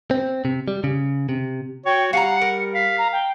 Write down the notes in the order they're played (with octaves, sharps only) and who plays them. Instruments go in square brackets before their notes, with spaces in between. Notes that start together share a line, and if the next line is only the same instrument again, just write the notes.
[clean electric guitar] C4
C3
G3
C#3
C3
[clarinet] F#4 [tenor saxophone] C#5 [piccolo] G5
[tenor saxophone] G3 [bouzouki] F5 G#5 A#5 [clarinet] F#5 [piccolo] C#7
[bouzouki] A#4
[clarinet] F5 [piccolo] B6
[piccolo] A#5
G5